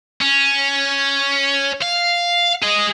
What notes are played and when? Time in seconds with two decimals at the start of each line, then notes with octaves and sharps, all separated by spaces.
0.21 C#4
1.82 F5
2.63 G#4 D#5